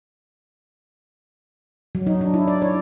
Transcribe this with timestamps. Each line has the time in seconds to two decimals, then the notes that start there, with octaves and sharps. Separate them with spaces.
1.95 F#3
2.07 D#4
2.21 D4
2.34 E4
2.48 D5
2.62 C#5